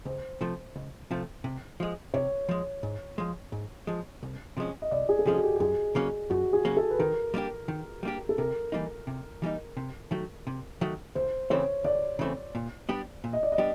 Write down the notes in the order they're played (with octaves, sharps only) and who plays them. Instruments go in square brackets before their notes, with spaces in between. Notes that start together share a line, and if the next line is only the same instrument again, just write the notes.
[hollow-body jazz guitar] C#2 [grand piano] C5
[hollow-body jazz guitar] C3 F3 A3
C#2
C3 F3 A3
C3
F3 G#3
[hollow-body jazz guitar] C3 [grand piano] C#5
[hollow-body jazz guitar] F3 G#3
G#2
F3 G#3
G#2
F3 G#3
C2
C3 F3 G#3 C#4
[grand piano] D#5
[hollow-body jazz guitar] C2 [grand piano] D5
[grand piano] G#4
A4
[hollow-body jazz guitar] C3 F3 G#3 C#4 [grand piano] G#4
[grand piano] F#4
G4
G4
[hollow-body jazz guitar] F#2 [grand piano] G#4
[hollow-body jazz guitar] C#3 F#3 A#3 C#4
[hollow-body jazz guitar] F#2 [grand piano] F#4
[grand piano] G#4
[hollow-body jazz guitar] C#3 F#3 A#3 C#4
[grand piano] A4
B4
[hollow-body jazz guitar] D#3 [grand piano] A#4
[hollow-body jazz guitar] G3 A#3 D4 G4
D#3
G3 A#3 D4 G4
[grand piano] A4
[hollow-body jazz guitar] C3 [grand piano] A#4
[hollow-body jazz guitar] E3 G3 A#3 D#4
C3
E3 G3 A#3 D#4
C3
D#3 F#3 A3
C3
D#3 F#3 A3
[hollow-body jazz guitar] D2 [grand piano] C5
[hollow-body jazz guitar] C#3 E3 A3 C4 [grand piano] C#5
[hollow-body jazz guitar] D2 [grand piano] D5
[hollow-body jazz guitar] C#3 E3 A3 C4
A#2
G3 B3 D4 G4
A#2
[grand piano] D#5
D5
D#5
[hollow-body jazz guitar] G3 B3 D4 G4